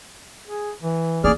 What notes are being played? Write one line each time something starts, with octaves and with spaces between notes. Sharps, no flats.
G#4
E3
G3 A#3 G#4 D5 F6